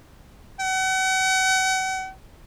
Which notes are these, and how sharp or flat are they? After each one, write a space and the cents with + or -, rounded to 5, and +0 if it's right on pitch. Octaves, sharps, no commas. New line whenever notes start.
F#5 +40